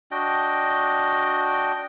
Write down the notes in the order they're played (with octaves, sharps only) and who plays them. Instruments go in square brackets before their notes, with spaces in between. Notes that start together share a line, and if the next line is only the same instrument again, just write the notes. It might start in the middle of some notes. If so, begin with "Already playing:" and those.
[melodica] D4 F#4 D#5 G5